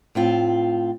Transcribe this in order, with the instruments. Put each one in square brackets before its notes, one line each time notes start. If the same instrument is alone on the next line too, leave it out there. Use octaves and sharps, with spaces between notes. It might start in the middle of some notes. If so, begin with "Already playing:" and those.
[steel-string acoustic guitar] A2 C4 F4